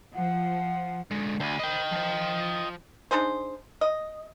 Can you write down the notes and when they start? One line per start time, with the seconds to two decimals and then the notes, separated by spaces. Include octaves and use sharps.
0.15 F3 F#5
1.11 D3 G#3
1.40 D2 C5 B5
1.59 D#5 G5
1.92 F3 C5
3.11 D4 D#4 G#4 C5
3.81 D#5